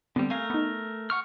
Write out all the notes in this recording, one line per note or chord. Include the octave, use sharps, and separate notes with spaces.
D3 G3 B3 C4
A3 A#4 F5 G#5
B3 D#4
F#5 C#6 F6